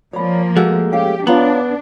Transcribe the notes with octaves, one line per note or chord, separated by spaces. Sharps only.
F3 A#3 C#5 D5 B5
G#3 A3 F#4
C#4 G4 F5 G5
B3 D4 F4 C#5 A#5